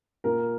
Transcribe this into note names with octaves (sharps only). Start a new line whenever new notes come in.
A#2 A#4